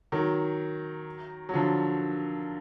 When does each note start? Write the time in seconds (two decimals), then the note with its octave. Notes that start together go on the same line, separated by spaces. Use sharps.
0.12 D#3 F#3
1.49 F#3
1.54 D3 F3